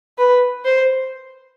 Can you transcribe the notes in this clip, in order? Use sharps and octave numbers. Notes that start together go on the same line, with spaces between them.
B4
C5